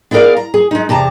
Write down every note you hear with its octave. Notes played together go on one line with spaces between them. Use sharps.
B3 E4 G#4 A#4 D5 F5
A#5
G#4
G#3 D#4
E2 C3 A5 A#5